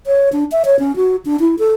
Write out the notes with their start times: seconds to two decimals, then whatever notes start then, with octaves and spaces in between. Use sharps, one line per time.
0.07 C#5
0.33 D4
0.52 E5
0.65 C#5
0.79 C#4
0.96 F#4
1.25 D4
1.40 E4
1.59 A4